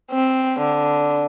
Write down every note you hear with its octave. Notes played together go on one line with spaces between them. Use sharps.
C4
D3